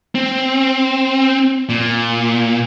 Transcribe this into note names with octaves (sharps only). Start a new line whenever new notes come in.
C4
A#2